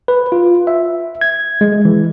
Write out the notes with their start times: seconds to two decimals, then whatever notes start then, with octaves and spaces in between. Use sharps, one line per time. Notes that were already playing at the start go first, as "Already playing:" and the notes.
0.08 B4
0.32 F4
0.67 E5
1.21 G#6
1.61 G#3
1.85 E3